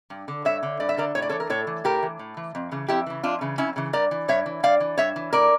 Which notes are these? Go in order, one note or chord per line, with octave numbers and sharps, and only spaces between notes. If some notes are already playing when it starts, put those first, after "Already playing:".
G2
D3
G2 C#5 E5
D3
G2 D5
E5
D3 A#4 D5
A2 C#5
D5
E3 A4 C#5
A#4
A2 A4 C#5
E3
A2 G4 A#4
E3
A2
E3
F2
C#3 E3
F2 E4 G4
C#3 E3
F2 D4 F4
C#3 E3
F2 C#4 E4
C#3 E3
G2 A#4 D5
E3
G2 C#5 E5
E3
G2 D5 F5
E3
G2 C#5 E5
E3
A2 A#4 D5